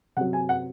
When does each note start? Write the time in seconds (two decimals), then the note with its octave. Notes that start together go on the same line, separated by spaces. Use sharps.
0.17 C3 F#3 F#5
0.33 G#5
0.49 F#5